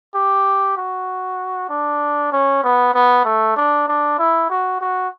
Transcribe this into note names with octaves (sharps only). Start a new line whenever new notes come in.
G4
F#4
D4
C#4
B3
B3
A3
D4
D4
E4
F#4
F#4